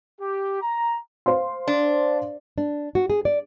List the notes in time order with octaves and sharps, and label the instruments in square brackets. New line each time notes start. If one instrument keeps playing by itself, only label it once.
[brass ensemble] G4
A#5
[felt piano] C5 F5 C6
[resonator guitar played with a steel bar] D4
[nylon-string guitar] D4
F#4
G#4
D5